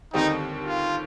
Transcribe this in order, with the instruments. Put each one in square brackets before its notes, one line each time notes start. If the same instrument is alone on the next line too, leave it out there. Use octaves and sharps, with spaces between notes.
[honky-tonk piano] D#2 D3 G3 C4 G4 [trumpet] D#4
[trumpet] F4